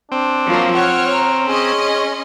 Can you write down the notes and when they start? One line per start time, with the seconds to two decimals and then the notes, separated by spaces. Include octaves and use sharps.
0.12 C4 D4
0.46 F3 F#3 A#3
0.75 C#5 F#5 F6
1.12 A#5
1.48 C#4 G#4 D#5 C6